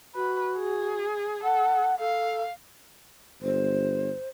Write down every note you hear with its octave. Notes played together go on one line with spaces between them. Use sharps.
F#4 B4
G#4
A4 F#5
A4 F5
G1 C5